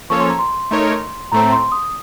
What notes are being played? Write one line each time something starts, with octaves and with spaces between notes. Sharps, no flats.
F3 A#3 C#4 A4 C#5 C#6
C6
A#5
C6
A3 D#4 A#4 C#5
A2 A3 C4 A#5
C6
D#6